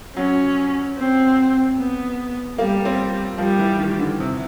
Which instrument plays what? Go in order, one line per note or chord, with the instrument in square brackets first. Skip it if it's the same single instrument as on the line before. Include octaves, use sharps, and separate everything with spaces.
[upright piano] F#3 [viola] C#4
[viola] C4
B3
[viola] G3 [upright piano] A#3
[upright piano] C4
[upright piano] F3 [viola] G3
[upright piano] E3
D#3
D3
C3